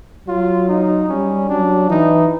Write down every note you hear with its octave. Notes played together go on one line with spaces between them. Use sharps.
F#3 F4
D#4
G3 C#4
F#3 D4
E3 D#4